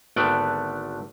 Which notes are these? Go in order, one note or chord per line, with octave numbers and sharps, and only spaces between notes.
G#1 D3 A3 B3 D5 G5